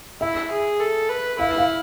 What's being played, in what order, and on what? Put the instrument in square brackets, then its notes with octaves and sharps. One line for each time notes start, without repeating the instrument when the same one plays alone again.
[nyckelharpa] E4 [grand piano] E5
[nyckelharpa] G#4
A4
B4
[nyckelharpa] E4 [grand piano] F5
[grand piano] F5